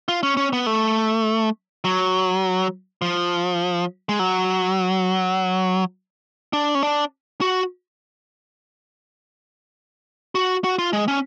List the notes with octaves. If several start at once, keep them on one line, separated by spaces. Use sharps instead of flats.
F4
C#4
C#4
B3
A3
F#3
F3
G#3
F#3
D4
C#4
D4
F#4
F#4
F#4
F4
G#3
C#4